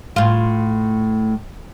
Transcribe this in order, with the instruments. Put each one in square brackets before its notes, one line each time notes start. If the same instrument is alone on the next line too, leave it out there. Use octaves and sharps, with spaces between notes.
[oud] A2 F4